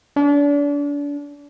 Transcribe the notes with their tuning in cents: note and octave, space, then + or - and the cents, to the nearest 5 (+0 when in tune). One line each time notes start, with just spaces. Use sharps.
D4 -35